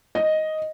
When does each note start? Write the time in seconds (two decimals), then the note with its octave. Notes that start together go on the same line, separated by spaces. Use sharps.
0.15 D#5